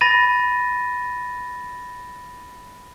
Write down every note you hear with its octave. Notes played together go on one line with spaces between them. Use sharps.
B5 A6 A#6 D#7